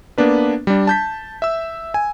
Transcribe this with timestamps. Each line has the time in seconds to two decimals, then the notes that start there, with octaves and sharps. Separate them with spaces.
0.18 A#3 B3 D4 B4
0.67 G3 D4
0.87 A5 G6 B6
1.42 E5 E6
1.94 G#5